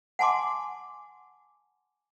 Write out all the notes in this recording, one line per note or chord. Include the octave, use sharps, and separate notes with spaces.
F#5 G#5 A5 C6 D6